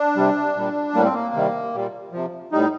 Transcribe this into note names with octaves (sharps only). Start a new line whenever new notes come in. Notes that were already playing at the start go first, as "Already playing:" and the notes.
Already playing: D4
C3 G3
A#2 G3
A2 G3 A#3
C4
A#3
C3 D#3 G3
A#2 G3
C3 F3
A2 G3 D#4